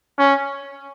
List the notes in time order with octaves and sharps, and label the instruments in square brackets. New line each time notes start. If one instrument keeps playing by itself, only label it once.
[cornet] C#4